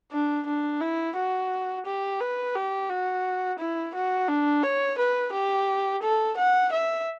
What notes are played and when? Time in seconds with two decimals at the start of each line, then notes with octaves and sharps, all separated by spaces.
0.12 D4
0.46 D4
0.81 E4
1.16 F#4
1.86 G4
2.21 B4
2.55 G4
2.90 F#4
3.60 E4
3.95 F#4
4.29 D4
4.63 C#5
4.99 B4
5.34 G4
6.03 A4
6.37 F#5
6.73 E5